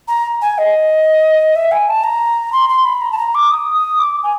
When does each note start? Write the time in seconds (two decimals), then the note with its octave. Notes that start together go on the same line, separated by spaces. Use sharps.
0.08 A#5
0.42 G#5
0.58 D#5
1.56 E5
1.72 G#5
1.89 A5
2.04 A#5
2.52 C6
2.69 C6
2.85 B5
3.01 A#5
3.12 A5
3.18 A#5
3.35 D6
3.51 D#6
3.76 D#6
3.99 D6
4.23 G#5